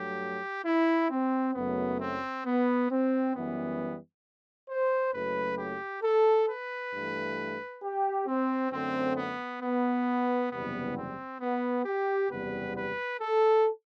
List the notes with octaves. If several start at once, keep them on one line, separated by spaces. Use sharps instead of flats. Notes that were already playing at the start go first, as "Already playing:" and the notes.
Already playing: G2 F#3 A3 G4
E4
C4
F#1 F#2 F#3 A3 B3
C4
B3
C4
F#2 E3 G3 B3
C5
F#1 F#2 F#3 A3 B4
G4
A4
B4
G2 E3 A3
G4
C4
F#2 D3 A3 C4
B3
B3
F#1 E2 C3 G3 B3
C4
B3
G4
F#1 E2 C3 G3 B3 B4
B4
A4